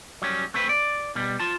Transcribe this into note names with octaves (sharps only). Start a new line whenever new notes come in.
F#3 G3 C#4
A3 C4 B4
D5
B2 G3
F4 A5